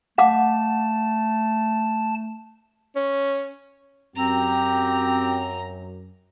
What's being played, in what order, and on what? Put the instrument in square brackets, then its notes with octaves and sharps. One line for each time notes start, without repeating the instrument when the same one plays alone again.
[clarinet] A3 [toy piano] F5 F#5 D6 [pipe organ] A5
[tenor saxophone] C#4
[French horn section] F#2 [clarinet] C4 [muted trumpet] G4 [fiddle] A#5